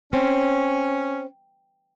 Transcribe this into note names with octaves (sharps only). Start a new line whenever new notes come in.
C4 C#4